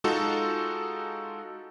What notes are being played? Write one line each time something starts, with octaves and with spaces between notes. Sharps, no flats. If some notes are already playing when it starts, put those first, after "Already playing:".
G#3 D#4 F4 F#4 A4